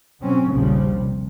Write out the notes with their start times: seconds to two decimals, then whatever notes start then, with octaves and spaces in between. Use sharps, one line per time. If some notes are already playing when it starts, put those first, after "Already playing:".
0.21 B2 F#3 C4 C#4
0.52 A#1 D#2 A#2 C#3 F3 G3
0.97 C3